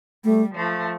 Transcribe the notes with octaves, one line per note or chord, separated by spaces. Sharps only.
G3 A3
F3 A3